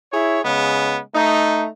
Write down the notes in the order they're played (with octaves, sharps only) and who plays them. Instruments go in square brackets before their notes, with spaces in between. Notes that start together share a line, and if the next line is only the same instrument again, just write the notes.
[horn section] E4 G#4 C#5
C#3 G#3 B3
A3 D#4